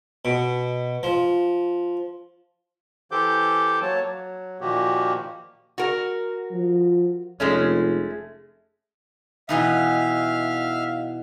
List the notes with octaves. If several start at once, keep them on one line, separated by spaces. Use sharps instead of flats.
B2
F3
E3 G4 A4 C5 D6 G6
F#3 A#3 C#5 A5
F#3
A#2 D#3 F3 A#3 F#4 G4
F#4 A#4
F3
F1 G#3 A3 C#4
B2 E3 D#4 E5 F5 F6